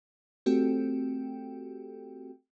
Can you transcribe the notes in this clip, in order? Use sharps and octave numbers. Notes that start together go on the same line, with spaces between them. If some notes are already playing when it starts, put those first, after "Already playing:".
A3 C4 F#4 G4 A4 G5